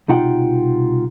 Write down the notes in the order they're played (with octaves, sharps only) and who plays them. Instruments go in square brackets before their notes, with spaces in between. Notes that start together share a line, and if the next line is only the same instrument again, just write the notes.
[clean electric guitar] C2 B2 D#4 F4 F#5 G5